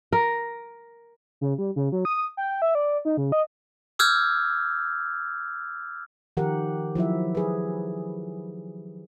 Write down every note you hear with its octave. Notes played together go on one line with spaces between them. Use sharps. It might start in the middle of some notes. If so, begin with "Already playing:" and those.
A#4
C#3
G3
C#3
F#3
D#6
G5
E5
D5
D#4
C#3
D#5
D6 E6 F6 G6 G#6
D#3 F3 G4 A#4 F#5
F3 F#3 E4 E5
G#4 B4